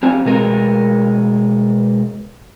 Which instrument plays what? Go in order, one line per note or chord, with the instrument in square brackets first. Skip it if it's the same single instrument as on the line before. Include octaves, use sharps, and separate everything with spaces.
[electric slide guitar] C4 G4 G#5
B2 G#3 A#4